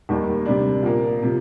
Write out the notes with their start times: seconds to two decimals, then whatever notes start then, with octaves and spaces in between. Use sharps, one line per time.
0.09 D#2 D#3 G3 A#3
0.45 C3 G3 D4
0.83 A#2 F3 A#3
1.23 C3 F3